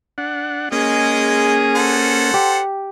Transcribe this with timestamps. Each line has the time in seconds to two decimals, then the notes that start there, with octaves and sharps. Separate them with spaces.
0.18 D4 F#5
0.72 G#3 A#3 C#4 G#4 D#5
1.75 A4 C5 F#5
2.34 G4